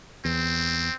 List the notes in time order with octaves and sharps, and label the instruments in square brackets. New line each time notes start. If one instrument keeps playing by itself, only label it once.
[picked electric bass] E2 [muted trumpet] C4